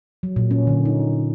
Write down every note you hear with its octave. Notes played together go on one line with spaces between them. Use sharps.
F#3
A#2
C#4
D3
D#4